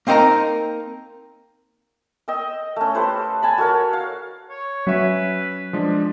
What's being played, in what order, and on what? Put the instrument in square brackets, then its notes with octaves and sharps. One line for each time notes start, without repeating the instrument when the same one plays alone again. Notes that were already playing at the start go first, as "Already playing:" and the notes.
[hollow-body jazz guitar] A#3 C4 D#4 A#4 A5 A#5
[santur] D#5 G5 E6
A3 C#4
G4 A4 B4 C5
G#5 A5 B5
F#4 A4 A#4 C#5
F5
[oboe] C#5
[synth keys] F#3 [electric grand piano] C#4 C#5 E5 [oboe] B4
[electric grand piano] F3 G#3 D4